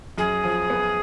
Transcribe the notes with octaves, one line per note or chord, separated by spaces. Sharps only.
F#2 G#4
F3
B3